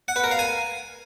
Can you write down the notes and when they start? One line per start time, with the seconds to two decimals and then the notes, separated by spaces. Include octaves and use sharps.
0.08 F#5
0.16 B4
0.24 A#4
0.31 F5
0.39 G#5